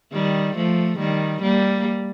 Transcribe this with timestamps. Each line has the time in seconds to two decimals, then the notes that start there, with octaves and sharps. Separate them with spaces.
0.13 D#3 G3
0.56 F3 A3
0.99 D#3 G3
1.42 G3 A#3